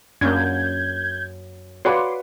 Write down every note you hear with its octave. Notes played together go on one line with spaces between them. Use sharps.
F#2 A#3 C#4 D4 G6 G#6
F#4 B4 C#5 D5 F5 F#5 C6 D6